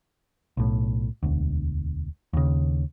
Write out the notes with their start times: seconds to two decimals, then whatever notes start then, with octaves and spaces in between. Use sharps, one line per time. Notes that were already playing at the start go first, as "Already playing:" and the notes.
0.57 B1 A2
1.23 E1 D2
2.33 D#2 C#3